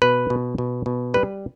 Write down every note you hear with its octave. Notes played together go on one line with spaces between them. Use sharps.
B2 B4
B2
B2
B2
G3 B4